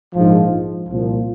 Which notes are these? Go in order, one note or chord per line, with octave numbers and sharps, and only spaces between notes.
A#1 G#2 F3
C2 A#2 F3